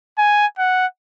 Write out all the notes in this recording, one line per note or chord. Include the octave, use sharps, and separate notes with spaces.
G#5
F#5